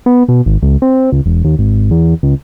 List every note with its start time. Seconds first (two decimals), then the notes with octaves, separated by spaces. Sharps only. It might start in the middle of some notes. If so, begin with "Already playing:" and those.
0.06 B3
0.29 B2
0.46 G#1
0.63 C#2
0.82 C4
1.12 C#2
1.26 E1
1.45 D#2
1.59 G#1
1.91 E2
2.23 C#2